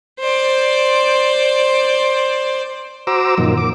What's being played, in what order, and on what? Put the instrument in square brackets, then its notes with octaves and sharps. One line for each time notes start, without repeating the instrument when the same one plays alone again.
[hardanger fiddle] C5 D5
[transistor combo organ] F#4 C5 A#5 D6 E6
F#2 A#2 D#3 F3
D6